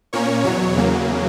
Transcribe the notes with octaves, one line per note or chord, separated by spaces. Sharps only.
A#2 A#3 C#4 C#5
E2 B2 F#3 C#5
E2 C#3 F#3 A#3